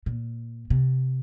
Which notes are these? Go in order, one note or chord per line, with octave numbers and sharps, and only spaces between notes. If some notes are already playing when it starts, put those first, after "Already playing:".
A#2
C3